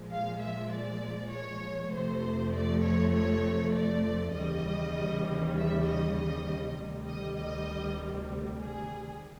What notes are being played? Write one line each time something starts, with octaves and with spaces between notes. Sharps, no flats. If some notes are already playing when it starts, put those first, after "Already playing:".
Already playing: A#2 F3 G#3
F5
E5
D5
C#5
F2 C3 F3 A3 C5
D5
C#5
C#5
D5
D#2 C#3 E3 G3 D#5
E5
D#5
D#5
D2 C3 D#3 G3
D#5
D#5
G#4